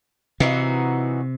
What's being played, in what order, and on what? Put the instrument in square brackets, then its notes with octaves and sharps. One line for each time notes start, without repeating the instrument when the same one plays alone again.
[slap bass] C3 [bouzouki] E3 D#4 F#4